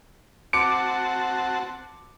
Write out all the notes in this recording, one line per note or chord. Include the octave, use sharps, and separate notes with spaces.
C4 F#4 A5 D6 C#7